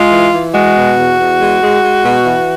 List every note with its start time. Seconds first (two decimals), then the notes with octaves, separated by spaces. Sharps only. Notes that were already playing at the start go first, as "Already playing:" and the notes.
Already playing: G#3 F4
0.10 E3
0.32 E3
0.53 G#3 F#4
0.75 B2
0.97 E2
1.18 E2
1.39 G#3
1.61 G#3
1.83 G#3
2.04 B2
2.25 E3